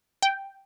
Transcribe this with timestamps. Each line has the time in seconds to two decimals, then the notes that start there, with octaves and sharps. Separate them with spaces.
0.22 G5